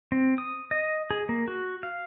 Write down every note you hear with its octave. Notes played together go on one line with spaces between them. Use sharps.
C4
D#6
D#5
G#4
A#3
F#4
F5